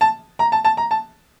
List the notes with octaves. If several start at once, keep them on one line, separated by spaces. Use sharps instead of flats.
A5
A#5
A5
A5
A#5
A5